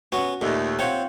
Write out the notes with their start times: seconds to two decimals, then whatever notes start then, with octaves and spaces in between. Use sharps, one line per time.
0.12 B3 C#4 F#4
0.41 D#2 A#2 A3 D#5
0.79 C4 F4 C#5 F#5 G5